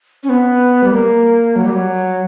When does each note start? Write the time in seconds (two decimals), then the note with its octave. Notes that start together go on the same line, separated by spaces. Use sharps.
0.23 C#4
0.29 B3
0.84 G3
0.93 A#3
1.56 F#3
1.65 G3
1.72 F#3